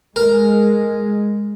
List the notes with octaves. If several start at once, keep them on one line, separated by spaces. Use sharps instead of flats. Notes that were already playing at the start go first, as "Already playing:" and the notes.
G#3 A#4